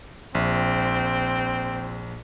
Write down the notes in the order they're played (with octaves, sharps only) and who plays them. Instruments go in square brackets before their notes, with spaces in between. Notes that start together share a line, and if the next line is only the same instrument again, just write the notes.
[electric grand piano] A#1 [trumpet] C4